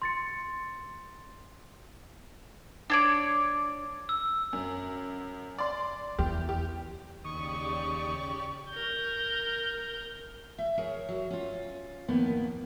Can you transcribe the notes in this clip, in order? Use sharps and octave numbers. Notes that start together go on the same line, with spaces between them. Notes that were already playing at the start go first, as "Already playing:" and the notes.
C6 A6 C#7
D4 C#5 D5
E6
F#2
D5 C6
E2 G4
G4
D#2 C#3 G4 D5 C#6 D#6
A#4 G6
E5
G#4 A#4 C#5 E5
F#3
C#4 F4
F2 A2 D#3 A#3 B3